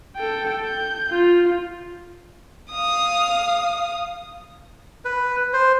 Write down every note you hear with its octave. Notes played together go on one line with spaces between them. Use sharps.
A4 G5
G6
F4
F5 D#6
B4
C5